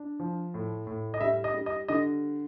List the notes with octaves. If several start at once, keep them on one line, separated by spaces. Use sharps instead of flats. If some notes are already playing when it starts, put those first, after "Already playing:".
Already playing: D4
F3
A2
A2
D#5
G3 E5
D#5
G3
D#5
D3 D#5